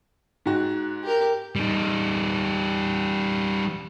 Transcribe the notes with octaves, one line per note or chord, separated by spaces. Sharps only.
G#2 F#4
G4 A#4
G3 D#4